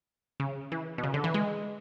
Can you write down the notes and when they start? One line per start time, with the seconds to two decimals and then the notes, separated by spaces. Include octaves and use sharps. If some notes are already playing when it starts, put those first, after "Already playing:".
0.40 C#3
0.72 E3
0.98 B2
1.04 C#3
1.14 D3
1.24 E3
1.34 G#3